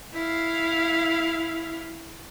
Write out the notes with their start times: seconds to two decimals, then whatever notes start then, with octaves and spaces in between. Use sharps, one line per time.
0.14 E4 F5